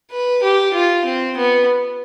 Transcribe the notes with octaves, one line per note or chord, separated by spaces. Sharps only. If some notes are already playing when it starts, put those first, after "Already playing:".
B4
G4
F4
C4
B3